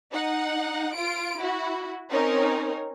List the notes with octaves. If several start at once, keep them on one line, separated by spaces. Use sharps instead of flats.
D#4 F#5
F4 D7
E4 F#4
C4 C#4 D#4 A#4 C#5